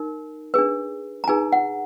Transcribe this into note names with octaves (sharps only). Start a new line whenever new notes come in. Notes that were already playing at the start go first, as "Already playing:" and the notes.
Already playing: D#4 A#4
D4 G#4 B4
A#5
D#4 G#4 B4 G#5
F#5